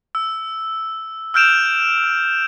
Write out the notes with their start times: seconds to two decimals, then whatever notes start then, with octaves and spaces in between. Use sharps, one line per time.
0.15 E6
1.34 E6 F6 G6 D7 E7 F7